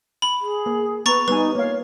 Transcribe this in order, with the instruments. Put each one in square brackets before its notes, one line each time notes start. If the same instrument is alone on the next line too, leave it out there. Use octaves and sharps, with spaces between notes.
[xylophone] B5
[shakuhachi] G#4
[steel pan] A#3
[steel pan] B3 B4 [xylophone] A#5 C#6 A6
[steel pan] G3 B3 G#5 [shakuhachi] D#4 [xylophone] B4
[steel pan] A#3 F5 [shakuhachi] C#5